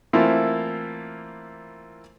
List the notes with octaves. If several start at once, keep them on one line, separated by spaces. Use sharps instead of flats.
E3 A3 A#3 C4 E4 F4